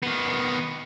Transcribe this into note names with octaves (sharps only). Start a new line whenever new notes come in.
D#3 B3